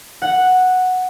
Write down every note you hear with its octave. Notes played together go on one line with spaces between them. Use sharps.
F#5